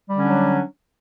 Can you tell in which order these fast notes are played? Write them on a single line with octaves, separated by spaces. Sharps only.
G3 D3 C#4 D4 F#3